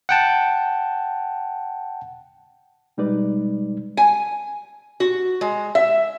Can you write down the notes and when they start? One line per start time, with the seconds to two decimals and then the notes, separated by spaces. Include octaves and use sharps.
0.09 F#5 G5 A5
2.97 B2 G3 G#3 D#4 B4 D5
3.97 G#5
5.00 F#4
5.41 G#3
5.75 E5